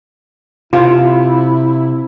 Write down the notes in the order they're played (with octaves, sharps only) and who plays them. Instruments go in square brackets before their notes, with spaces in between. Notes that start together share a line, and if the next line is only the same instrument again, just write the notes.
[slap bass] C3 [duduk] E4 [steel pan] F4